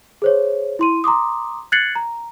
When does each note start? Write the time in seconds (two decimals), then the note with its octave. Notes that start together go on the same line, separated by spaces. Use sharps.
0.22 G#4 C5 C#5
0.79 E4 C6 D#7
1.04 A#5 C6 D6 D#6
1.72 F#6 G#6 A6 C7 C#7 F#7
1.95 A#5